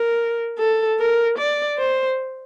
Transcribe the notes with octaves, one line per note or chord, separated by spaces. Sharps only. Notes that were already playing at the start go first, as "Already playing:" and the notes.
Already playing: A#4
A4
A#4
D5
C5